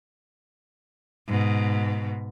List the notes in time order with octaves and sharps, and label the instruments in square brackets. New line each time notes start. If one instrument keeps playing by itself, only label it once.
[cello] G#2 B2